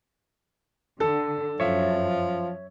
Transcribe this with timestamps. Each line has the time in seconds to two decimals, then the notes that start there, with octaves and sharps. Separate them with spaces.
1.00 D3 A4
1.60 F#2 F3 C#5 E5